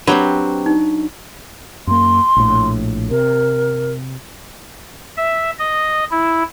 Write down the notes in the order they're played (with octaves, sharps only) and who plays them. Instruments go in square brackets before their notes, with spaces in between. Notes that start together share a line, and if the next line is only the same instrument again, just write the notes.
[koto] F#3 [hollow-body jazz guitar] C4 G4 B4 [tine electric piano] D4
[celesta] D#4
[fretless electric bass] F#2 A#3 [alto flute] C6
[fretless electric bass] A#1 A2
[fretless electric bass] C3 [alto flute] A#4
[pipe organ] E5
D#5
E4